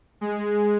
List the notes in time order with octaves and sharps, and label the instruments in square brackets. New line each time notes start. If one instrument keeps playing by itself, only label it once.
[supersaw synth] G#3